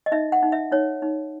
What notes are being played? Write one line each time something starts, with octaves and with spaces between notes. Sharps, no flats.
D#5
D#4 E5
F#5
D#4
E5
D#4 C#5
D#4